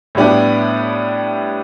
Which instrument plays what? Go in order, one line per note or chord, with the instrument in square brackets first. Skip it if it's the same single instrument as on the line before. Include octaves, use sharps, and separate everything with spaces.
[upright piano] A2 G3 B3 D4 G4